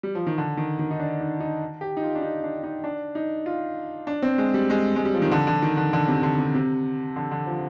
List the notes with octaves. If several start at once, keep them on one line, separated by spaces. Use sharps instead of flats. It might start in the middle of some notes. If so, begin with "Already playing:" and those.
G3
F3
D#3
D3
D#3
D#3
D#4
D4
D#4
D#4
G4
D#4
F4
D4
D#4
D4
D#4
D4
D#4
F4
D4
C4
G#3
G3
G#3
G#3
G3
F3
D#3
D3
D3
D#3
D3
D3
C3
D3
C3
C3
D3
D3
F3